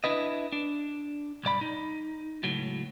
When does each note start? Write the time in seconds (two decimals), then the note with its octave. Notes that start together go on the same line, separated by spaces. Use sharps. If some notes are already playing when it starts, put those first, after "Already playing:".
0.04 D4 E4 B4 D#5
0.52 D4
1.44 B1 G2 D5 B5
1.61 D#4
2.43 C#2 A2 F#3